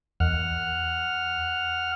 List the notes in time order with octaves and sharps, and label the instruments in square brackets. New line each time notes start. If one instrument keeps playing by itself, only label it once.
[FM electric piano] E2 [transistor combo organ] F#5 F6